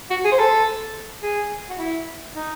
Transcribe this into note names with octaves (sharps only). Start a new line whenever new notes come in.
F#4
G#4
C5
A4
G#4
F#4
E4
D#4